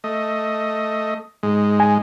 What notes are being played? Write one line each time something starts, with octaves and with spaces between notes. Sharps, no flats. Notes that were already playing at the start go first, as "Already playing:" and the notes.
A3 D#5
G#2 G#3
G#5